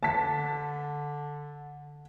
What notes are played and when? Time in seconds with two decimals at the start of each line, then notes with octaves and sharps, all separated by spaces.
0.03 D3 A5 B6